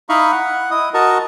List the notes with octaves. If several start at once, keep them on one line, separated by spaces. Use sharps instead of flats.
D#4 E4 D#5 F5 B5 C#6
F#5
E4 D#5 D#6
F#4 A#4 D#5 A5 A#5 C#6